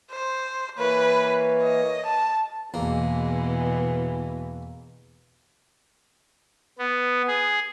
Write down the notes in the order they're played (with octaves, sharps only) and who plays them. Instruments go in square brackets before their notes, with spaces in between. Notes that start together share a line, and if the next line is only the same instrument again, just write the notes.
[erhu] C5
[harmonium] E3 A#3 C#5 [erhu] B4
[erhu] D#5
A5
[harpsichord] E2 A#3 [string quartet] B2 E3 G#3
[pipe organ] B3
G#4